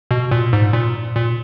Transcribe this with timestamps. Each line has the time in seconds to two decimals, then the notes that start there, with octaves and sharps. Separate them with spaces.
0.11 B2
0.31 A#2
0.53 G#2
0.73 A#2
1.15 A#2